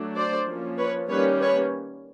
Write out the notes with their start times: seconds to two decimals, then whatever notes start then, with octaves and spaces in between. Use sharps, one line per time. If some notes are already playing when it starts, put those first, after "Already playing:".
Already playing: F#3 A3 D4
0.16 C5 D5
0.47 F3 A#3 C#4
0.78 B4 C#5
1.09 D#3 G3 A#3 C#4 B4 C#5
1.41 B4 C#5